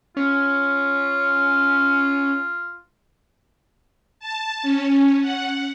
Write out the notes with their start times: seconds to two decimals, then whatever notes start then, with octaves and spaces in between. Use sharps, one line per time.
0.17 C#4 F4
4.20 A5
4.63 C#4
5.21 F#5